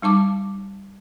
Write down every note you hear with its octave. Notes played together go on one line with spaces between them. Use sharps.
G3 D#4 A5 D6